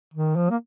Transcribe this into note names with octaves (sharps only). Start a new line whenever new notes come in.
D#3
F3
A#3